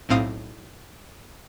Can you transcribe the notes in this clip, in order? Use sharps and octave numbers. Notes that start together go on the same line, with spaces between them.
B1 A2 C4 F5 D#6